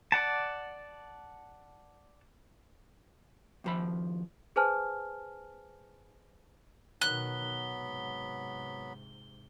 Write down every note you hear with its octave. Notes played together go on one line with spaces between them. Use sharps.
D5 F#5 A5
D#2 F3 B5
G#4 B4 C5 G#5 A5 F6
B2 D#3 F#3 B3 B5 F#6 G7
G#2 C3